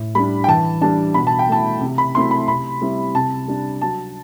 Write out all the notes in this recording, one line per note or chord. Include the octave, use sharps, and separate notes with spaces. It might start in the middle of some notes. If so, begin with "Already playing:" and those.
Already playing: A2
G3 D4 B5
G5
E3 A5
G3 D4 A5
B2 B5
A5
G5
A3 E4 A5
C3
B5
F#3 A3 C4 E4 C6
B5
C3 B5
G3 C4 E4
C3 A5
G3 D4
F#3 A5